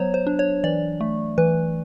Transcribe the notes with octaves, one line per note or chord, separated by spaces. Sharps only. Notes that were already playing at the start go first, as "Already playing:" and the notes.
Already playing: F#3 B3 C5 C#5
C5
D4
C#5
E3 D5
A3
E3 B4